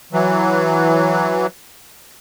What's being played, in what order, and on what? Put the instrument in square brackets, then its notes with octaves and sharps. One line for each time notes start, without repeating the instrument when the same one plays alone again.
[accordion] E3 F#3